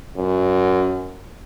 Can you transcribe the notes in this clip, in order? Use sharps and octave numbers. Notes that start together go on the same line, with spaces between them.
F#2